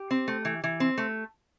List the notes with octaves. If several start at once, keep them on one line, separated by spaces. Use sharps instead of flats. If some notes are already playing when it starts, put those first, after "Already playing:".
Already playing: G4
C4
A3
E3
E3
C4
A3